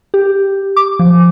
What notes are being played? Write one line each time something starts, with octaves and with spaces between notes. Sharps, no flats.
G4
D6
F3